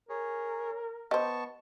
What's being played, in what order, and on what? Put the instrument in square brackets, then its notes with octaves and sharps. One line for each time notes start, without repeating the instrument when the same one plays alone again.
[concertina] G#4 C#5 [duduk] A#4
[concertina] B3 A5 C#6 [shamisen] G4 C5 [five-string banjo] D#5